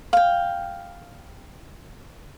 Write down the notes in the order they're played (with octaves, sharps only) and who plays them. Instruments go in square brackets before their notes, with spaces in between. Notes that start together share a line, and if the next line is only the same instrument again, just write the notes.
[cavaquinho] F5 G5